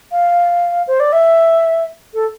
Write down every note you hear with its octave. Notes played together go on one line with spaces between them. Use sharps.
F5
C5
D5
E5
A4